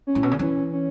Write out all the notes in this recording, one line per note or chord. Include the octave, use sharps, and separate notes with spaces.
C#4
A2
B2
C#3
E3 C#4
C#4